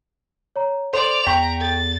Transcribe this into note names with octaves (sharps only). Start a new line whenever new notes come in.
C#5 A#5
A4 C5 D5 F7
E2 G5 A#5 C#6 B6 F#7
A4 A6